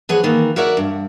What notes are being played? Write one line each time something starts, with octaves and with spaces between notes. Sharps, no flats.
E3 F3 G#4 C#5 F#5
D#3 E3 A#3
F#4 A#4 C#5 D5 E5 F#5
G2